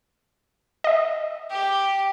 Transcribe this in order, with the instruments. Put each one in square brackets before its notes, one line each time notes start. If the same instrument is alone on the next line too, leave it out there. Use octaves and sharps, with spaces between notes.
[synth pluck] D#5 E5
[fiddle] G4